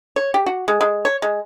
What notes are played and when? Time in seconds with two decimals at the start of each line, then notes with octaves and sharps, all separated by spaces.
0.16 C#5
0.34 G4
0.46 F#4
0.68 G#3
0.81 G#3
1.05 C#5
1.22 G#3